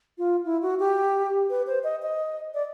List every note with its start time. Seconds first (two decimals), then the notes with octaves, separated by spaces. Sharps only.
0.18 F4
0.45 E4
0.62 F#4
0.79 G4
1.50 B4
1.67 C5
1.84 D#5
2.02 D#5
2.54 D5